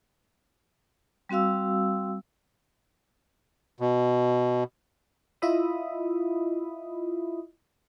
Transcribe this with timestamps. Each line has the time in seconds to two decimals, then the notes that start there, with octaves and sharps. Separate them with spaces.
1.29 G3 C4 F#4 F5 E6
3.80 B2
5.42 E4 F4 D#5 E5 B5 D#6